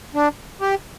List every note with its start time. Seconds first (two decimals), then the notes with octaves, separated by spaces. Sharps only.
0.14 D4
0.61 G4